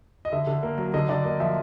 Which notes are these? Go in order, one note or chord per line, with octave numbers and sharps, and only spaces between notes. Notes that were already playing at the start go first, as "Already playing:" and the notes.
D#5
D3 E5
D3
A#3
F#3
D3 D#5
D3 D5
A#3 D#5
F3 E5